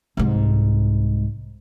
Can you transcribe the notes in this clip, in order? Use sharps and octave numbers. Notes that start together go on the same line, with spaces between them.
C2 G#2